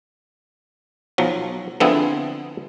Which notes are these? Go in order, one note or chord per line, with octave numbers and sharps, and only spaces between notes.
B1 F3 F#3
D3 F3 B3 C4 E4 G#4